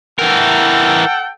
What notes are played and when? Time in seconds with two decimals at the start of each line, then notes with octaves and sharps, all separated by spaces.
0.19 E3 A4 A#4 F#5 G5